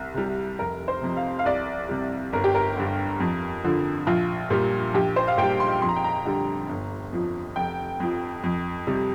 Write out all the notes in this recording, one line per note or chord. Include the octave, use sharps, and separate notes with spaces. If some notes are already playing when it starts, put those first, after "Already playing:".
Already playing: C2
C3 G3
F1 A#4
C5
F2 C3
F5
F5
C2 D5
C3 G3
G1 A#4
G4
A#4
G2 D3
F2
D3 F3
A#1 F4
A#2 G3
A#1 G4
C5
F5
A#2 G3 G5
C6
F2 C6
A#5
G5
A#5
D3 G3
G1
F2 F3
F1 G5
F2 F3
F2
C3 G3